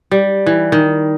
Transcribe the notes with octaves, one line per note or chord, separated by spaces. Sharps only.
G3
E3
D#3